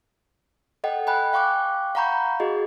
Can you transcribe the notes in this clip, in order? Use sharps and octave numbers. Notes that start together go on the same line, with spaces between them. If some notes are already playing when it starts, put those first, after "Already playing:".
A4 D#5 F#5 G5
G5 G#5 B5 F#6
F5 G5 C#6 D6 F#6
F5 F#5 A#5 B5 C#6 G6
F#4 G#4 D#5